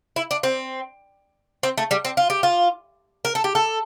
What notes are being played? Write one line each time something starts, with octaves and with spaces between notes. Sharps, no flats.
E4
D4
C4
C4
A3
G3
C4
F4
G4
F4
A#4
A4
G4
A4